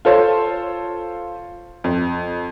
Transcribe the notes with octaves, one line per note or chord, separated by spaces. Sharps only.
F4 A4 C5 C#5
F2